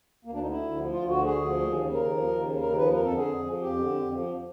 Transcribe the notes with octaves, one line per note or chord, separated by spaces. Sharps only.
D2 A#3
D4
D3 D#4
E4
D2
F3
D2 F4
D3 F#4
D2 G#4
F3
D#2
C#3
D#2 A#4
F3
D#2
C#3
D#2 A#4
F3 B4
F2 A#4
A4
D3
G#4
F2
F3
F2 G4
D3
F2
F3